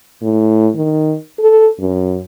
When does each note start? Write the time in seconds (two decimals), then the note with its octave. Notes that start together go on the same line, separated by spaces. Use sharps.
0.22 A2
0.76 D#3
1.39 A4
1.80 F#2